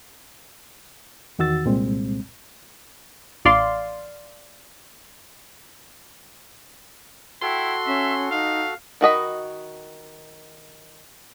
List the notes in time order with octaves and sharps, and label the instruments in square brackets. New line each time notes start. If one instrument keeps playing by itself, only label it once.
[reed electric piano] E2 D#3 F#4 E6 A6
C2 A#2 G3 G#3 C4
[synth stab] A1 D5 F5 C6
[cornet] E4 [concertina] F#4 A4 [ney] G5 [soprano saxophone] C6
[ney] C#4 [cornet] E5
[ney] D#4 [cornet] F5
[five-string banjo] D#3 F#4 D#5 B5